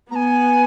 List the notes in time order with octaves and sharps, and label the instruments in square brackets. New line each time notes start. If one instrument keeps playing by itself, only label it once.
[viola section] B3 [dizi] A#5
[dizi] G#5